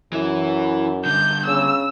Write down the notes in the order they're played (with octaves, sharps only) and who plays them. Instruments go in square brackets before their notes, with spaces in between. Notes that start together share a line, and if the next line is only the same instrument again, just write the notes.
[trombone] F#2 [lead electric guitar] E3 E4
[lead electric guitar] G2 D3 [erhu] G6
[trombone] C#3 [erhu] E6